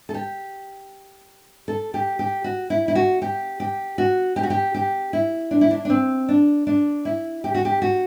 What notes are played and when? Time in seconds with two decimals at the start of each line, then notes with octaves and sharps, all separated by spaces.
0.09 A4
0.14 G4
1.68 A4
1.94 G4
2.19 G4
2.44 F#4
2.70 E4
2.88 E4
2.95 F#4
3.22 G4
3.60 G4
3.98 F#4
4.36 G4
4.43 F#4
4.50 G4
4.75 G4
5.13 E4
5.51 D4
5.61 E4
5.71 D4
5.85 D4
5.90 C4
6.29 D4
6.67 D4
7.05 E4
7.44 G4
7.55 F#4
7.65 G4
7.82 F#4